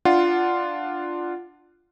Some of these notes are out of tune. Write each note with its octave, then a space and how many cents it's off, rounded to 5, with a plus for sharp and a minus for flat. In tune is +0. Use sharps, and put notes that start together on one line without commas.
D4 +10 F4 -5 F#5 +0